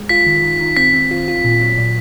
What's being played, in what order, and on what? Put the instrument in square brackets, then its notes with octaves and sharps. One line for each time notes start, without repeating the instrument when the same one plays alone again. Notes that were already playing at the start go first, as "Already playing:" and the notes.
Already playing: [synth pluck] G#3
[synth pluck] F4 [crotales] B6
[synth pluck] D#3
D#3
D#3
[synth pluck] C4 [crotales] B6
[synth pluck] C4
F4
F4
A#2
F#3
A#2